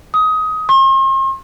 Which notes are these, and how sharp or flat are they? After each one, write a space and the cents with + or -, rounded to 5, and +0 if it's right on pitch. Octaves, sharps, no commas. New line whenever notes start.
D#6 +20
C6 +45